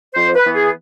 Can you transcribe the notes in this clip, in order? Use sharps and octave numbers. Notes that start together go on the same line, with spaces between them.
F2 C5
B4
E3 B3
G#4